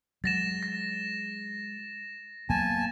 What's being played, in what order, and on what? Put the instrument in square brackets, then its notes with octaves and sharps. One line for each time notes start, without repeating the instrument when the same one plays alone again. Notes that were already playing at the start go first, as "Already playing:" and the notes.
[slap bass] F#3 G#3 [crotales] A6 A#6 E7
[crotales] A#6
[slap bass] F#3 A#3 B3 [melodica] G#5 A5